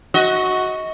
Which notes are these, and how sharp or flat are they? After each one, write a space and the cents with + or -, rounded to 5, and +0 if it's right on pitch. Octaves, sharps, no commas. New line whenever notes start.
F#4 +0 D#5 +30